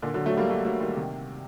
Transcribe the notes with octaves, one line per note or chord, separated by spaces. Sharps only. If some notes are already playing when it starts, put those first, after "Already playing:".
A#2 D3
D3 F#3
F#3 A3
G3 A#3
F#3 A3
F#3 A3
D#3 G3
C3 D#3